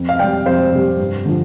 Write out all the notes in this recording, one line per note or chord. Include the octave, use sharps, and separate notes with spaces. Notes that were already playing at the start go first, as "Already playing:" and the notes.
Already playing: F2
F5
C3 G3 D5 G5
F2 C5 F5
C3 G3
G2
D3 F3